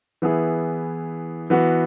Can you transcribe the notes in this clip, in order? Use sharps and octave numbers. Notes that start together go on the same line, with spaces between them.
E3 B3 E4 G#4
E3 B3 F#4